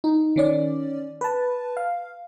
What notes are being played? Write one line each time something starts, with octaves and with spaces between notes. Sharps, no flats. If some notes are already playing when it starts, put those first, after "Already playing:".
D#4
D#3 C#4 D5
B4 A5
F5